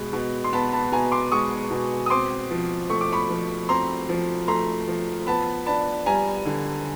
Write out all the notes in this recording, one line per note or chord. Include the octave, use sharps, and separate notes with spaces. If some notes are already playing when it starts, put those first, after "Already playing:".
Already playing: B2 G#3 B5
B2
C6
B3 A5 B5
A5 B5
B2 G#5 A#5
C6 D6
G#3 C#6 D#6
B2
D#6
C4 C6 D6
F3
A3 C#6
D6
B5 C#6
F3
C4 A#5 C6
F3
A3 A#5 C6
F3
B3 A5 B5
D4 A5 B5
G3 G#5 A#5
D3